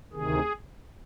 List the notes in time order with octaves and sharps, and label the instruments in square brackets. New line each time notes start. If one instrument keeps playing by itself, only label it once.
[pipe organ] D2 C3 D#3 G#4